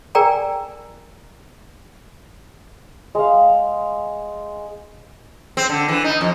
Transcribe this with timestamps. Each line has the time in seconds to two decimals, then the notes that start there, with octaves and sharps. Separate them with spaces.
0.15 G#4 A#4 D5 G5 G#5 A#5
3.15 G#3 F5
5.57 C4
5.69 D3
5.89 E3
6.04 D#4
6.21 F2